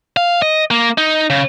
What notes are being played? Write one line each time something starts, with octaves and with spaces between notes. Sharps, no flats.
F5
D#5
A#3
D#4
C#3